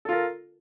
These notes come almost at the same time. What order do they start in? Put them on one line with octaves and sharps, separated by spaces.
A4 F4 A#4